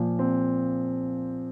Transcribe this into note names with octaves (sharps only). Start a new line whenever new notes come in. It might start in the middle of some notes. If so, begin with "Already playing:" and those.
Already playing: A#2 F3
C4